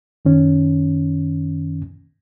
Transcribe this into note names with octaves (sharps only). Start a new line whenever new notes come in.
F#2 D#3 C#4